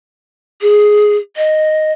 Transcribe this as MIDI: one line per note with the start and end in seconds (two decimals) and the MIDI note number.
0.62 1.16 68
1.37 1.92 75